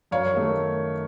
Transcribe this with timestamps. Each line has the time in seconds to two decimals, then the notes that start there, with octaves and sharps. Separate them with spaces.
0.11 F#2 C#5 F5
0.34 D#3 A3